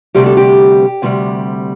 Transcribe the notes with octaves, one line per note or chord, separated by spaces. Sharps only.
D2 C3 G3 G4
A4
G4
D2 C3 G3